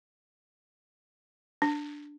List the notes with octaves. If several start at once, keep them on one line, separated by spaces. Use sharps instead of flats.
D4